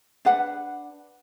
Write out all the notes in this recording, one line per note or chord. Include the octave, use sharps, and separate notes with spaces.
D4 B4 F#5